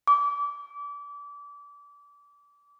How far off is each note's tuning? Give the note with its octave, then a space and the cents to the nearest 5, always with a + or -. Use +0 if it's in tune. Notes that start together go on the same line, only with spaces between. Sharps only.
D6 -30